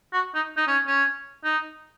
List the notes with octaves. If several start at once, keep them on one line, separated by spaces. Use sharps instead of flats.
F#4
D#4
D#4
C#4
C#4
D#4